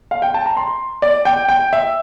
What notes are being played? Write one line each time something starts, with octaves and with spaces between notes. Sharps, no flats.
F5
G5
A5
A#5
C6
D5
G5
G5
E5